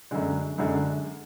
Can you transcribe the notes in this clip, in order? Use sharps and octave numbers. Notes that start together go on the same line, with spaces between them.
F#2 D3 G#3
F#2 D3 G#3